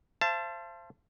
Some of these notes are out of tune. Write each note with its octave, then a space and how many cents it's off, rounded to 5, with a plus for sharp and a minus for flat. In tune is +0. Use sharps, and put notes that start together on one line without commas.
C5 +10 F5 -45 A5 +0